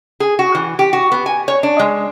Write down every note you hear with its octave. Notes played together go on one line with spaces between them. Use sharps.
G#4
F#4
E3
G4
F#4
B3
G#5
C#5
D4
G#3